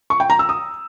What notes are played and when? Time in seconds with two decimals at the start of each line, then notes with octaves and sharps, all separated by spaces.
0.10 C#6
0.20 G5
0.30 A#5
0.39 E6
0.49 D#6